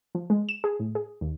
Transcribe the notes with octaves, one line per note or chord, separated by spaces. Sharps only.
F3
G#3
E7
G#4
A2
G#4
D#2